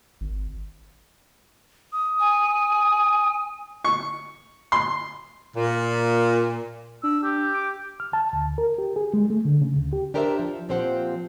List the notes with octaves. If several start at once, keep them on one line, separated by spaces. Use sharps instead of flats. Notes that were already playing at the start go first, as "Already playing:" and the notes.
G#1
D#6
G#5
C#6
C6
A#2
D4 E6
G4
D6
F6
A5
D2
A#4
G4
G#4
G#3
A3
D3
C#3
D2
G4
D4 G4 A#4 C5 D5 E5
F3
A#2 F3 C4 G4 C5 F#5